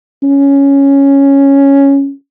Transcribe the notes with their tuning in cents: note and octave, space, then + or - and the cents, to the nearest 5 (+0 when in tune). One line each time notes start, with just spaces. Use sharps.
C#4 +0